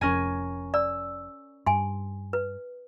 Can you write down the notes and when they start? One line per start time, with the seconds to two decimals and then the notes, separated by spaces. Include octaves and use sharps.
0.01 F1 F2 C#4 A#4 G#5
0.74 D5 E6
1.66 G2 G#5 C6
2.33 B4